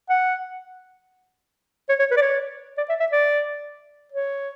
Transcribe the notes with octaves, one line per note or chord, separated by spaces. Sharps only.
F#5
C#5
C#5
B4
D5
C#5
D5
E5
E5
D5
C#5